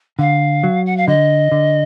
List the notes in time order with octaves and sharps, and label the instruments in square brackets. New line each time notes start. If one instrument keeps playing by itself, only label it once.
[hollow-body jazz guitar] D3 [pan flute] F5
[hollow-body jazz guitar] F#3
[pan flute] F#5
F5
[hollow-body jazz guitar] D3 [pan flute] D#5
[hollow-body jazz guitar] D3